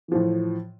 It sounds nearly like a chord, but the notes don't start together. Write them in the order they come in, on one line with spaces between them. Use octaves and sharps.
E3 F3 A2